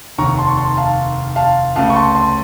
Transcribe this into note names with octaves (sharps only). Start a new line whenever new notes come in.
F1 D#2 D#3 A#5 C#6
A5 C6
C#6
A5 C6
F5 A5
F5 A5
C#2 C#3 A3 F5 A5
C#6
A5 C6
A5 C6